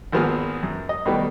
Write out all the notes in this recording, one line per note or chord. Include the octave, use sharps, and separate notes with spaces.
G#1 F3 A#3 B3 G#4 F6
F#2
D#5
B2 D#3 G3 A3 B3